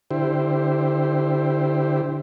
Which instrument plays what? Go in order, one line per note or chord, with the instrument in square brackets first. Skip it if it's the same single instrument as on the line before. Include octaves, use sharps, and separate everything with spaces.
[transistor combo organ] D3 E4 G4 C5